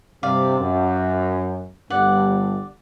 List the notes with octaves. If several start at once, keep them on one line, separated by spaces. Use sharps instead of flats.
G2 C3 D5 F5
F#2
G1 G2 D5 F#5